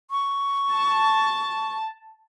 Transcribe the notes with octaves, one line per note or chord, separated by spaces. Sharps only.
C#6
A5